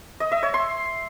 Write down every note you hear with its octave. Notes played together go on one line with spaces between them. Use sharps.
D#5
E5
C#5
C6